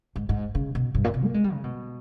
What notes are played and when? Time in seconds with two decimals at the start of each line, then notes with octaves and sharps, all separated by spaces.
0.16 G#2
0.29 G#2
0.55 C#3
0.75 B2
0.95 G2
1.04 A#2
1.14 B2
1.24 A#3
1.34 G#3
1.44 G3
1.53 C#3
1.64 B2